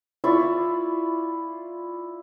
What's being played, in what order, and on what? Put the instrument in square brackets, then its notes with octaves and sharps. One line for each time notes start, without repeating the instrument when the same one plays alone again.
[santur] E4 F4 D5 C#6